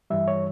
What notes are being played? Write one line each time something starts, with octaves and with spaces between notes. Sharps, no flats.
G2 E3 G3 E5
C#5